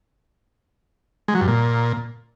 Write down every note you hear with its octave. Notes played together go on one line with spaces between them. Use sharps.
G#3
F#3
G2
A#2